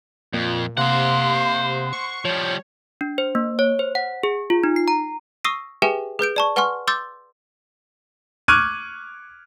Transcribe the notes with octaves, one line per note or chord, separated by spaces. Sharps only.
F2 A#2
C3 A#3 C5 F#5 C6
C#6
F3 G3 C#5
D4
C5
A#3
C#5
C5
F#5
G#4
F4
D#4
C7
A#5
C#6 D#6 E6 A#6 C7 D#7
G4 G#4 B4 E5 G5 G#5
G#4 B4 G6 D7
D5 A5 C#6
B4 F#5 G#5 C6 C#6 F6
C6 D6 E6 G6 A6
C#6 D6 F6 F#6 G#6 D#7